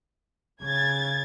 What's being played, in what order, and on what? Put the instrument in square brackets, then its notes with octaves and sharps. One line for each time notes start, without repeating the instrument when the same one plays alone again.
[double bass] C#3 [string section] G#6 A6